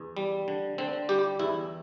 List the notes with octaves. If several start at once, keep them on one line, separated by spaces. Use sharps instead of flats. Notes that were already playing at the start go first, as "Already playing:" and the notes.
Already playing: E2
G3
D3
D3 C4
G3 G4
E2 E4